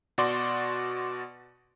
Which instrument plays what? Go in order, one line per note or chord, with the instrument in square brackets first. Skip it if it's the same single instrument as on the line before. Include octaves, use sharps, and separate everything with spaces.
[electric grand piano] B2 F#4 D5 C6